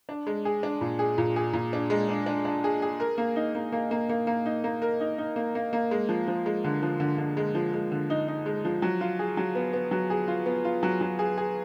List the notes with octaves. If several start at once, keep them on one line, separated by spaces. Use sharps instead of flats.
D4
G#3
G#4
D4
A#2
G#4
A#2
G#4
A#2
D4
G#3
D4
D4
D4
G#4
G#4
A#4
A#3
D#4
A#3
A#3
A#3
A#3
A#3
D#4
A#3
A#4
D#4
D#4
A#3
A#3
A#3
G#3
F3
F3
G#3
D3
F3
D3
D3
G#3
F3
G#3
D3
D#4
D#4
G#3
F3
F#3
F4
G#4
F#3
B3
B3
F#3
G#4
F4
B3
F4
F#3
F#3
G#4
G#4